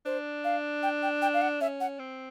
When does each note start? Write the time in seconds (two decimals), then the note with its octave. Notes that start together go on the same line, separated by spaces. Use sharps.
0.05 D4 C5
0.44 F5
0.83 G5
1.03 G5
1.22 G5
1.34 F5
1.42 F#5
1.61 C#4 E5
1.80 F#5
1.99 C4